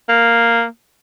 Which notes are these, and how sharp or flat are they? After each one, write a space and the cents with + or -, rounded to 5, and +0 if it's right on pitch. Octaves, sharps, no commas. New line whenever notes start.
A#3 -5